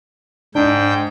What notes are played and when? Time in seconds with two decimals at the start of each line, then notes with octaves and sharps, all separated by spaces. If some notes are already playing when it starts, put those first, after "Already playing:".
0.55 G#2 D4 G5